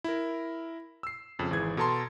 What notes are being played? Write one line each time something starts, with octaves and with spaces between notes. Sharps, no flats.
E4 A#4
E6 C7
F2 C#3
G#1 E3 G#4 G#6
B2 A4 A5 A#5 C6